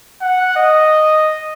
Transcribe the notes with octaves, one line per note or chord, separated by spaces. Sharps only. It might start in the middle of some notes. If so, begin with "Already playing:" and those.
F#5
D#5